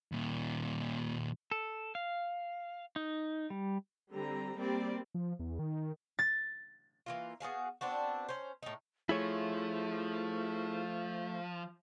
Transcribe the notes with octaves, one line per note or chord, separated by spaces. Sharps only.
D#2 A#2
A4
F5
D#4
G3
D3 G3 C4 A#5
G3 A#3 C4 D5
F3
E2
D#3
A6
E3 A#3 F4
B3 F#4 G#4 F5
B3 C4 D4 F#4
C#4 C5
A2 D#4
F3 A3 E4 G#4 C#5